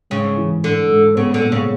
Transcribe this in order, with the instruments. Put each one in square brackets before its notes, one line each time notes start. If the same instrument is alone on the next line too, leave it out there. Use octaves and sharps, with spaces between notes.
[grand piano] G#2 [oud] C#3
[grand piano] E3
[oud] D3 [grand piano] A3
[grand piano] G#2
[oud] C#3 [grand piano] B3
[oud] D3
[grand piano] A#2
[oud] C#3